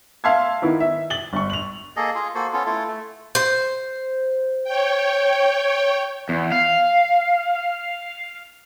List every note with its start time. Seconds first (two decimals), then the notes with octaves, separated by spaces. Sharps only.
0.24 E5 F5 A5 C6 E6 G#6
0.62 D#3 B3 E4
0.80 E5
1.10 A6 F#7 G7
1.33 G1 C#6
1.50 F7 F#7
1.97 A#3 G#4 A4 D#5
2.15 F4 G#4
2.35 A#3 F#4 A4 C5
2.53 B3 C#4 F4 A4
2.66 A3 E4 F4 A4
2.88 A3
3.35 C5
4.64 C#5 G5
6.29 E2
6.52 F5